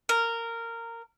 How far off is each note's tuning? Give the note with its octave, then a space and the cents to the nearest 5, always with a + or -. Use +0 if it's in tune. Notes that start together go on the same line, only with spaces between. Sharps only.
A#4 -15